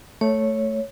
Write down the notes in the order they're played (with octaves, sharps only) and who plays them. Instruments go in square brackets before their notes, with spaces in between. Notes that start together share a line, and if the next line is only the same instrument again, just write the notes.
[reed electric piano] A3 [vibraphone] C#5